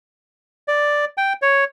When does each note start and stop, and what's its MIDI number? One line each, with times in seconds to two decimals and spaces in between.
0.68 1.05 74
1.18 1.33 79
1.42 1.64 73